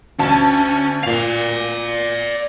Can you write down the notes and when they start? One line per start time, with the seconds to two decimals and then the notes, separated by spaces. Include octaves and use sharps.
0.20 D2 C#4 A5
1.03 A#2 D5 F5 F7